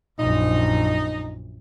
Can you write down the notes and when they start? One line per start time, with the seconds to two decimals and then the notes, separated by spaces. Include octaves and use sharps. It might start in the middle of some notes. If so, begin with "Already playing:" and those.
0.18 A#1 F#2 D#4